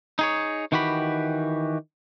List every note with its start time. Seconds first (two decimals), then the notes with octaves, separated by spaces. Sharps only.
0.19 D#4 G#4 C#5
0.72 D#3 E3 F#4 G4 B5